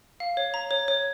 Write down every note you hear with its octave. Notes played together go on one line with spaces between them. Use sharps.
F5
C#5
A#5
C#5
C#5